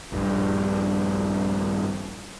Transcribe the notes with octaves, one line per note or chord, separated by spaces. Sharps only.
A#1 G2